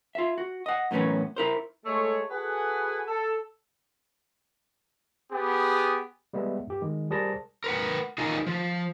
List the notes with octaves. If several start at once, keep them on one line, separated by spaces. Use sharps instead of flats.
F4 E5
F#4
D#5 F#5
F#2 A2 E3 B3 C#4
E4 A#4 C5
G#3 A3 C#5
F#4 G#4 A4 B4 F#5 G#5
A4
B3 G4 G#4
G3 G#3 B3 E5
G2 G4
D#3 G#3
G3 G#4 A#4 C5 A5 A#6
A#4 B4 F#5
D#4 F4 G#4 A#4
F3